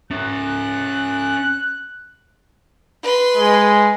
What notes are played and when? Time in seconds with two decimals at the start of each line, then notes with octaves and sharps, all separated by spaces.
0.11 C#4 E5 F#6
3.03 B4 C6
3.37 G#3